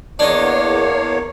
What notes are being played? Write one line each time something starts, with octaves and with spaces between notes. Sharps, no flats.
E2 A#3 D4 C#5 D#5